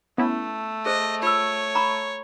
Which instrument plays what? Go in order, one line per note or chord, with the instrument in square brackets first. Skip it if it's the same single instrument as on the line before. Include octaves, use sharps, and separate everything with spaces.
[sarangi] A3 [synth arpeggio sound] B3 C#4 E4
[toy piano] G#4 C5 [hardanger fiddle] D#5
[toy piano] F4 E6 [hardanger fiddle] C#5
[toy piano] A#5 B5 C#6